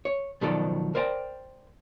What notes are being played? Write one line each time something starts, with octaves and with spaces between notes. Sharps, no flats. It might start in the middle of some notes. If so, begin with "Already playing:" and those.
C#5
B2 D#3 F3 F#3 A4 D5
A#4 C5 D5 G5